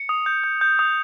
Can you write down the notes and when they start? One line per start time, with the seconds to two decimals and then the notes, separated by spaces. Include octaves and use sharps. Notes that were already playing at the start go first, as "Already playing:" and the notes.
Already playing: C#7
0.09 D#6
0.26 G6
0.44 G6
0.61 G6
0.79 D#6